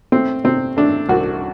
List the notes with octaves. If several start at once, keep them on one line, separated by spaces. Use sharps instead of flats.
A3 C4
C3 C4
A3 D4
C2 F#4